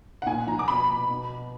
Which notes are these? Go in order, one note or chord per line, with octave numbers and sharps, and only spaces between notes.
F#5
A#2 G#5
F3 A#5
D6
B2 B5
B2